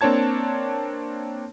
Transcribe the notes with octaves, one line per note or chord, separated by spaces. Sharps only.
A#3 C4 D4 C#5 A5 G#6